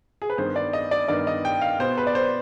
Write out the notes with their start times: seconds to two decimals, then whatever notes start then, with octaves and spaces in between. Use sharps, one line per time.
0.22 G#4
0.30 B4
0.38 G2 D#3 B3 C5
0.56 D5
0.73 D#5
0.91 D5
1.08 G2 D#3 B3 D5
1.27 D#5
1.45 G5
1.61 F5
1.79 B2 B3 C5
1.98 B4
2.07 D5
2.15 C5